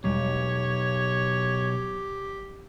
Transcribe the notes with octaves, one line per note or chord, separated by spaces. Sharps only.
B1 E2 G3 G#3 G4 C#5